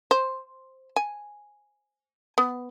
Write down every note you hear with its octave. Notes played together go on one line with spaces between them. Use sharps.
C5
G#5
B3